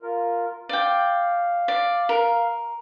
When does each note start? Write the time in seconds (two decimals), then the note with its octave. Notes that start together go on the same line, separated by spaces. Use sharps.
0.03 F4 A#4
0.69 D5 F5 G5
1.68 D5
2.09 A#4